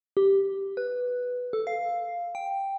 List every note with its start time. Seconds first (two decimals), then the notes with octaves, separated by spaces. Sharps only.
0.17 G4
0.77 B4
1.53 A4
1.67 F5
2.35 G5